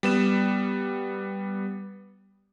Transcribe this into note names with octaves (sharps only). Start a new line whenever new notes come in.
G3 B3 E7